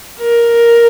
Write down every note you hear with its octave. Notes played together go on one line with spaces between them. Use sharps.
A#4